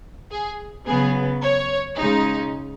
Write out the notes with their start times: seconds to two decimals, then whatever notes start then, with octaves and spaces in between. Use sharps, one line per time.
0.32 G#4
0.87 C#3 F#3 B3 G#4
1.43 C#5
1.99 C#3 G#3 D#4